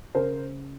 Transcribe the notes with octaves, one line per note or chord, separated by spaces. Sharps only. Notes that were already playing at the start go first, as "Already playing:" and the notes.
C#3 A#4 C5